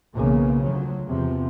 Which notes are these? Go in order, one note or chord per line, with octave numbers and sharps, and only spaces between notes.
B1 C#3 E3 A#3
D2 F3 F#3
E2 C3 F3